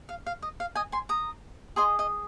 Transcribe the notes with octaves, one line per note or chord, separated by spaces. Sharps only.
F5
F5
D#5
F5
D#5 G#5
G#5 C6
A#5 D#6
G#4 D#5 G#5 C6
D#5